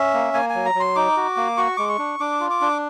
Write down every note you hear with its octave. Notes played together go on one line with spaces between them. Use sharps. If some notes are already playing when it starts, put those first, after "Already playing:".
Already playing: C#4 E5
A#3
A#3 G#5
F#3 G#5
A#5
F#3
C6
D#4 D6
F#4
A#3
F#4 C#6
G#3 D6
C#6
D4
D4 D6
F4
D6
D4